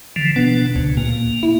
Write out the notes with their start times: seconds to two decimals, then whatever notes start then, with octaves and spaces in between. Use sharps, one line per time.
0.16 D3 E3 F3
0.36 B2 B3 D4
0.76 D2 C#3
0.97 A#2 A#3
1.43 E4